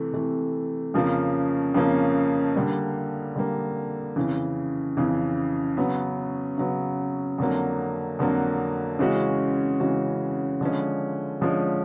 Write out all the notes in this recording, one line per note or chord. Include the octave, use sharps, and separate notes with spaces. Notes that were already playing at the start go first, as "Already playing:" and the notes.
Already playing: C3 E3 A3
C3 E3 A3
F2 C#3 F3 A#3 C#4
F2 C#3 F3 A#3 C#4
D3 G3 A#3
D3 G3 A#3
F2 C#3 E3
F2 C#3 E3
C#3 F#3 B3
C#3 F#3 B3
F2 D3 F#3 A#3
F2 D3 F#3 A#3
C#3 E3 G#3 C#4 F#4
C#3 E3 G#3 C#4 F#4
D3 F3 G#3 C#4
D3 F3 G#3 C#4